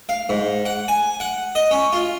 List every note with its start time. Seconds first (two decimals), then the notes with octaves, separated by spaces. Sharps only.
0.09 F5
0.29 G#2
0.65 F#5
0.88 G#5
1.20 F#5
1.55 D#5
1.71 C#4
1.93 F4